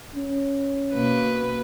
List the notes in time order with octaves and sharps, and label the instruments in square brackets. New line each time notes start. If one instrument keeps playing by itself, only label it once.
[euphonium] C#4
[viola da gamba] B2 A#3 B4